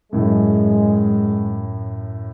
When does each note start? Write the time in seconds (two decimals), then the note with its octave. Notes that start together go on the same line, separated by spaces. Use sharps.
0.13 F#2 A2 G#3